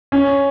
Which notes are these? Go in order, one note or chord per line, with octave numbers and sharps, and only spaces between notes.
C#4